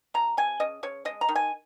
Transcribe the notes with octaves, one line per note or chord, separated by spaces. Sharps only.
C3 A#5
C3 G#5
C#3 D#5
C#3 C#5
G#3 D#5
A#5
D#3
G#5